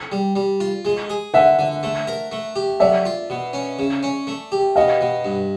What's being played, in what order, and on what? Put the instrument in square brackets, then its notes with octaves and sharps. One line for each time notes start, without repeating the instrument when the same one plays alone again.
[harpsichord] G3
G3
F4
G#3
G#4
[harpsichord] D3 [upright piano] E5 F#5
[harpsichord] D3
A3
A#4
A3
G4
[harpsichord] F#3 [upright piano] D5 E5
[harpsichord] F4
B2
C#4
C#3
C#4
A3
G4
[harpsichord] B2 [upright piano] D#5 F5
[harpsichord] B2
G2